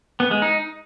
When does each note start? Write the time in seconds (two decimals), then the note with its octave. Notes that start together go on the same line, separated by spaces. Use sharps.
0.20 B3
0.31 G#3
0.42 D#4